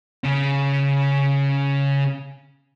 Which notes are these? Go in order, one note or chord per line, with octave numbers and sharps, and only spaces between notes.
C#3 C#4